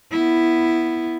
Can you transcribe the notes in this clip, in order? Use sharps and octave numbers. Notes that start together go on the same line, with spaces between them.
B3 E4